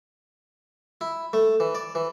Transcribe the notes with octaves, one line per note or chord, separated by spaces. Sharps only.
E4
A3
E3
D5
E3